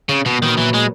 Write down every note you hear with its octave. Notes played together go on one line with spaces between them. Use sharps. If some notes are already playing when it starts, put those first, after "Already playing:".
C#3
B2
A#2 D#3 F#3 B3
E3
G#3